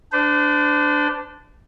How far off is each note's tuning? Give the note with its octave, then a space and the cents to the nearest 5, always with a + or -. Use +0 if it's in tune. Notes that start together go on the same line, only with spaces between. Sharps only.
D4 +0 C5 -40